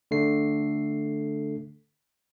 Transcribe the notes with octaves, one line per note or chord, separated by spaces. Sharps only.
D3 A3 C7